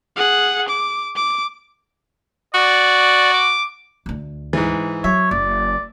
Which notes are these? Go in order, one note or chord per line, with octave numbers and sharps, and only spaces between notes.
G#4 F#5
D6
D6
F#4 D5
D6
D2 D3
G#2 E3
F#3 C#5 E5
F#1 D5